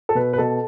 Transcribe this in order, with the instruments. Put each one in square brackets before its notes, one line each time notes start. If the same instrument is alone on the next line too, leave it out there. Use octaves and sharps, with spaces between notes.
[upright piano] A4
B2 B4
B4
B2 A4